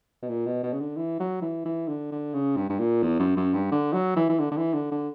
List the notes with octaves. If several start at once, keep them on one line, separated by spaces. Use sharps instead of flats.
B2
A#2
B2
B2
C#3
D3
E3
F#3
E3
E3
D3
D3
C#3
G2
G2
A#2
E2
F#2
F#2
G2
D3
F#3
E3
E3
D3
D3
E3
D3
D3